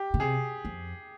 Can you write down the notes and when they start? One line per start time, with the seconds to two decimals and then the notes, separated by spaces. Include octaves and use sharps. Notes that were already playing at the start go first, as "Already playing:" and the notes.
Already playing: G4
0.14 C#3
0.20 C3 G#4
0.65 F2